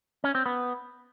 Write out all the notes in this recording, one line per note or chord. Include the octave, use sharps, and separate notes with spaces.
C#4
C4
B3